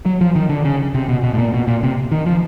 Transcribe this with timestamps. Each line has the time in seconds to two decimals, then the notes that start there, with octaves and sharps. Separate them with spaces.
0.06 F#3
0.21 F3
0.36 D#3
0.49 D3
0.65 C#3
0.94 C3
1.09 B2
1.23 B2
1.33 A2
1.38 A#2
1.54 B2
1.67 A#2
1.83 C3
2.12 D#3
2.26 F3